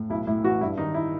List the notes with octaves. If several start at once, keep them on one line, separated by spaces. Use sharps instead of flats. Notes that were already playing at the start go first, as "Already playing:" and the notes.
Already playing: A2
B1 E4
A2 E4
E3 F#4
G2 E4
D#3 D#4
E4